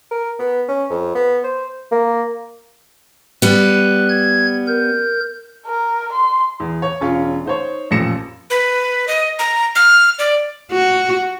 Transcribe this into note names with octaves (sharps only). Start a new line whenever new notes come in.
A#4
B3
C#4
F2
B3
C5
A#3
G3 B3 F#6
G#6
A#4 G6
A#4
C6
E2
C#5
E1 C#4 F4
D#4 C5 C#5
A1 F2 A#2 A#6 C#7 E7
B4
D#5
A#5
F6
D5
F#4